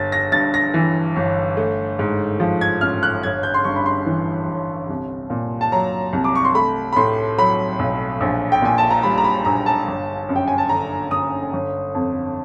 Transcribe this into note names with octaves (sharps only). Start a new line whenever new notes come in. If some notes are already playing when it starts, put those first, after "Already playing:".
Already playing: G1 A6
A#6
G2 A6
A#6
E3
G1
A3
G#2
F3
G#6
A1 F6
F#6
G1 G#6
G6
C6
G2 C#6
B5
C6
E3
G1
C2
A#2
A5
F#3 A#5
C2
D6
C#6
C6
A3 B5
B5
A2 C6
F#3 B5
B1
A#1
G5
A#2 G#5
A5
A#5
G3 B5
A#5
B5
A#1 A#5
A5
G1
F#2
G5
G#5
A5
D3 A#5
G1 D#6
G1
F2